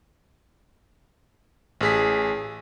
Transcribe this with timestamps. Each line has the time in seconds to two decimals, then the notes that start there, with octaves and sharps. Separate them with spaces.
1.81 A1 G#4 B6